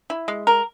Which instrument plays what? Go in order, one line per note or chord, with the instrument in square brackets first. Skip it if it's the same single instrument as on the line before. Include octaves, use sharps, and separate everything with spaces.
[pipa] E4
G#3
A#4